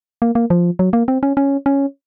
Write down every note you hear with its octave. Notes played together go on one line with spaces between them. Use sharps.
A#3
A#3
F3
F#3
A#3
C4
C#4
C#4
C#4